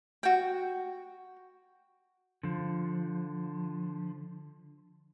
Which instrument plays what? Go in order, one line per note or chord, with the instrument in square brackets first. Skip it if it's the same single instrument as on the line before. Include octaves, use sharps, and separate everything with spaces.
[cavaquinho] F#4 G5
[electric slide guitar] D3 F3